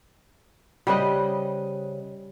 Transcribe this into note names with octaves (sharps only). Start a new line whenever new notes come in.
C#3 G3 B4 C5 D#5